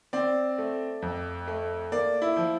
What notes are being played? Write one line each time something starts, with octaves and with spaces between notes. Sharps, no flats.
C4 D5
A3
F2
A3
A#3 D5
E4
F3